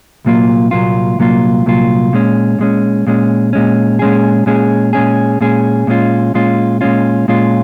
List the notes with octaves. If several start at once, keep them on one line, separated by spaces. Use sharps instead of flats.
C2 A#2 F#3 A#3 F4
C2 A#2 F#3 A#3 F4
C2 A#2 F#3 A#3 F4
C2 A#2 F#3 A#3 F4
A#2 G#3 C#4
A#2 G#3 C#4
A#2 G#3 C#4
A#2 G#3 C#4
A#2 G#3 C#4 G#4
A#2 G#3 C#4 G#4
A#2 G#3 C#4 G#4
A#2 G#3 C#4 G#4
A#2 G#3 C#4 F4
A#2 G#3 C#4 F4
A#2 G#3 C#4 F4
A#2 G#3 C#4 F4